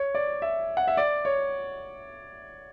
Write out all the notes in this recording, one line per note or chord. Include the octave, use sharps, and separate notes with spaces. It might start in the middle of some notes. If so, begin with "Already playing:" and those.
Already playing: C#5
D5
E5
F#5
E5
D5
C#5